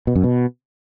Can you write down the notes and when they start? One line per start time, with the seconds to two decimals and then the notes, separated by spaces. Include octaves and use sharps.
0.07 B2
0.15 F#2
0.24 B2